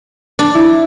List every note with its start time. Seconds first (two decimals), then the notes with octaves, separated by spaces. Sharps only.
0.39 D4
0.55 E4